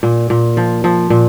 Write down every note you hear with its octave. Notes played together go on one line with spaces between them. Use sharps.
A#2
A#2
F3
F3
A#2